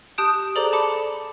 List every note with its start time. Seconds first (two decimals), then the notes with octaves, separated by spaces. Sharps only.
0.18 G4 A5 D#6 F#6 G6 D7
0.56 G#4 A4 C5 D5 A#5 D6
0.73 A5 B5 D6 C#7